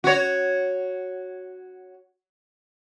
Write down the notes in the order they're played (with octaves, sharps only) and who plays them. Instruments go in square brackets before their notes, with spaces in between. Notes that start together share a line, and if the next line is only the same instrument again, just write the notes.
[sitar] F#4 C#5